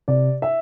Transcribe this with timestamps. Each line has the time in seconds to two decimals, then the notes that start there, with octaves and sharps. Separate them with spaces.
0.08 C3 D5
0.42 E5